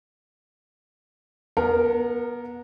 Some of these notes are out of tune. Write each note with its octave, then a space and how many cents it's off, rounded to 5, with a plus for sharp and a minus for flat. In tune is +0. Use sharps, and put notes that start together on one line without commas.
B3 -30 A#4 +0